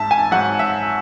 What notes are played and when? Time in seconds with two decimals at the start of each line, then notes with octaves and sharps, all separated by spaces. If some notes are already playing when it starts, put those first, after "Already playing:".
Already playing: G#2 E5 A5
0.11 G#5
0.31 G#2 F#3 F#5
0.59 E5